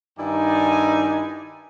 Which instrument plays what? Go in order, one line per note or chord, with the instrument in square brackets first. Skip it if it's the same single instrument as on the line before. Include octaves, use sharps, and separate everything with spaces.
[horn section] G2 D#3 D#4 E4 D5 G#5